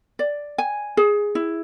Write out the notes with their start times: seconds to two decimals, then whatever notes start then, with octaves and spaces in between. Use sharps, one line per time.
0.19 D5
0.58 G#5
0.97 G#4
1.35 E4